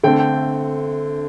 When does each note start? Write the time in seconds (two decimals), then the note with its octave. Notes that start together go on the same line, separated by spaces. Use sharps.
0.03 D3 A3 C4 G5
0.19 G5